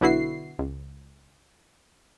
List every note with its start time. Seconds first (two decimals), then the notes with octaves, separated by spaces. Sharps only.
0.01 B1 D3 B3 E4 F#4 C7
0.59 C#2